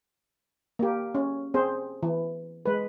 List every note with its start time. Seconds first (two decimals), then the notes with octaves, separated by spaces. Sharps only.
0.79 A#3 G4
1.15 C#4
1.54 C4 G#4 C5
2.03 E3
2.66 G#3 B4